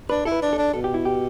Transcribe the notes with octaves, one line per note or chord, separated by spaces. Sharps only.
D4 B4
E4 A4
B4
D4
A4
D4
B2 A4
G4
E4
G4